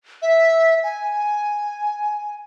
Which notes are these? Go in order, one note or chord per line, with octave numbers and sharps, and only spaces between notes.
E5
G#5